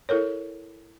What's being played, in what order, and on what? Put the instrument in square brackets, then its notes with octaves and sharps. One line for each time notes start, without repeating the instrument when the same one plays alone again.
[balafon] E4 A4 A#4 C#5